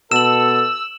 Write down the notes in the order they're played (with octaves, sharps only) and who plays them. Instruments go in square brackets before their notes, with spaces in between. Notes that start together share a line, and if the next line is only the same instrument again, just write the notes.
[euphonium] B2 [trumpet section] A4 [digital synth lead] E6 [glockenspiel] E7 F#7